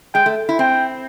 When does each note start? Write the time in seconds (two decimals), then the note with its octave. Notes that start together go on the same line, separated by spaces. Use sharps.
0.14 G#3 G5
0.26 A3
0.49 E4
0.59 C4 G5